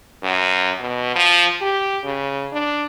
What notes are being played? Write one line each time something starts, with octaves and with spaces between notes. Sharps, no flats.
F#2
B2
F3
G4
C#3
D4